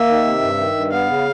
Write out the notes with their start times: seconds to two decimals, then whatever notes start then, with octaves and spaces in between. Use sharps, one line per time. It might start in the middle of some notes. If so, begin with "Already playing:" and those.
Already playing: A#3 E5
0.08 D#3
0.25 C3
0.41 G2
0.59 D#3
0.75 G2
0.92 B3 F5
1.09 C#3